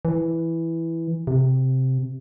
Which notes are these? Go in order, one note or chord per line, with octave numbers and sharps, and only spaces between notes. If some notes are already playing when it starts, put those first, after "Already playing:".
E3
C3